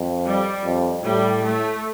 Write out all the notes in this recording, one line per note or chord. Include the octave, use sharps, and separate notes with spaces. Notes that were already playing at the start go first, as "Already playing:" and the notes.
Already playing: F2
G3
F2
A2 G3
A3